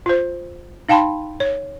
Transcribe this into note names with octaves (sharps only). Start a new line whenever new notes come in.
F4 C5
D#4 F5 G5 A5 B5 C6
C#5